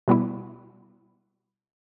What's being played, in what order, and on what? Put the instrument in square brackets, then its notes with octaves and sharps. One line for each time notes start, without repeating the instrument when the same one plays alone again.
[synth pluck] B2 G3 B3 E4